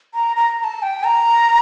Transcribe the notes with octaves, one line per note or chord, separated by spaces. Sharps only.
A#5
A#5
A#5
A5
G5
A#5